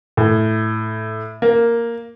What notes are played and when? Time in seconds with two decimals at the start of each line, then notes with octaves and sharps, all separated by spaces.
0.17 A2
1.42 A#3